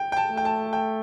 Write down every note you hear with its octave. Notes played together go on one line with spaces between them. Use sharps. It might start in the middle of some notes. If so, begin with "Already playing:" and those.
Already playing: G5
G5
A5
A3
G5
A5
G5